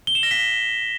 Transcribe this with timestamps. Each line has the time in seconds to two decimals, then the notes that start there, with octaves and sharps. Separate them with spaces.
0.07 G7
0.15 E7
0.23 A#6
0.31 B6